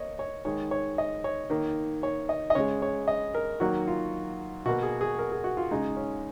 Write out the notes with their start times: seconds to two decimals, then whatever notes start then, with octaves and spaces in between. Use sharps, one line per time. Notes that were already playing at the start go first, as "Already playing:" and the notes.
Already playing: A#3 C#5 D#5
0.19 C#5
0.45 D#3 G#3 C#5
0.71 C#5
0.98 D#5
1.24 C#5
1.50 D#3 A#3
2.03 C#5
2.29 D#5
2.50 D#5
2.55 C#3 G#3 C#5
2.82 C#5
3.08 D#5
3.35 A#4
3.60 D#3 F#3 A#3 F#4
3.87 F4
4.66 B2 A#3 F#4
4.83 G#4
5.01 G#4
5.19 A#4
5.32 G#4
5.44 F#4
5.57 F4
5.71 C#3 G#3 D#4
5.97 C#4